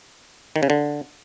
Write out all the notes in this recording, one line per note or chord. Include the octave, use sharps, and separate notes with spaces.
D#3
C#3
D3